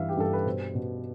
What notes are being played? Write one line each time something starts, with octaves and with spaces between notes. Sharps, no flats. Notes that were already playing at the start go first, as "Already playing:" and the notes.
Already playing: G2 E3 E5 F5
G4
G2 A4
B4
B2 C5
B2